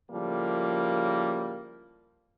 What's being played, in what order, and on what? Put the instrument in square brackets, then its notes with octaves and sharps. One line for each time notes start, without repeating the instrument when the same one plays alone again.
[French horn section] A2 C#3 F3 G3 A#3